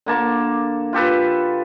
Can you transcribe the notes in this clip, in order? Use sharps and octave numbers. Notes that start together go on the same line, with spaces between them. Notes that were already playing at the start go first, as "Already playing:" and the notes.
D3 A#3 A5 C#6
F4 G4 A4 B4